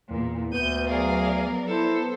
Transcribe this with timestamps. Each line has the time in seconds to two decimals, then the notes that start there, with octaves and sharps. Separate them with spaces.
0.10 E2 A#2
0.52 D2 B3 G6 D#7
0.88 F#3 G#4 A#4 D5 F5
1.68 E4 A4 C5